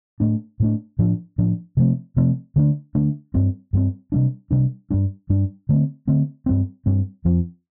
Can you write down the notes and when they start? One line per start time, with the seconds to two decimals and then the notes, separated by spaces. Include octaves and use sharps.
0.20 A2 A3 D4
0.60 A2 A3 D4
0.99 A2 F3 D4
1.38 A2 F3 D4
1.77 C3 F3 A3 C4
2.17 C3 F3 A3 C4
2.56 D3 A3 D4
2.95 D3 A3 D4
3.34 G2 G3 C4
3.73 G2 G3 C4
4.12 C3 G3 D4
4.51 C3 G3 D4
4.90 G2 G3 D4
5.30 G2 G3 D4
5.69 D3 A3 C4
6.07 D3 A3 C4
6.46 G2 G3 C4
6.86 G2 G3 C4
7.25 F2 F3 C4